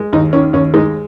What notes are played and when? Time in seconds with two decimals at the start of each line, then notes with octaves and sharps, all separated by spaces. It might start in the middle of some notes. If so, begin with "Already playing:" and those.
Already playing: G#3
0.13 D#2 D#4
0.33 D#3 C#4
0.53 D#2 C#4
0.74 G#3 D#4